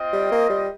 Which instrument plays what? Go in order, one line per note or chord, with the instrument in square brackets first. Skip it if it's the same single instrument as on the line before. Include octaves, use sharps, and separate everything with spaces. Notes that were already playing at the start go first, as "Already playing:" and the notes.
Already playing: [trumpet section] C4 F4 D#5 G5
[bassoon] G3
A#3
G3